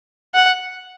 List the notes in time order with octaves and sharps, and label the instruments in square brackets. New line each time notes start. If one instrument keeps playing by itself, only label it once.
[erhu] F#5